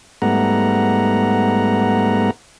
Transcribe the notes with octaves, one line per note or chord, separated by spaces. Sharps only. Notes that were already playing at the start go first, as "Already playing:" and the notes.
G#2 G3 A3 B3 F#5 A#5